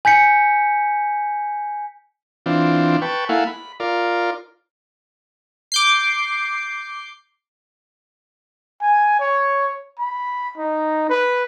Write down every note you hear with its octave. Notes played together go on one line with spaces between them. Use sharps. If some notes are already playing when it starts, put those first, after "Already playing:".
G#5 G6 B6 C#7
E3 C4 D4 F4
B4 G5 A5 C#6
A#3 E4 A4 F5 F#5 G#5
B5
F4 A#4 D5
D6 G6 C7
G#5
C#5
B5
D#4
B4